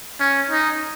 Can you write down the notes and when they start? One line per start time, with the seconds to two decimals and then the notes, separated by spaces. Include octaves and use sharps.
0.20 C#4
0.49 D#4